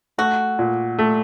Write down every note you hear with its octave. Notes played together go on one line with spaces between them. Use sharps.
A3 F#4
A#2
A3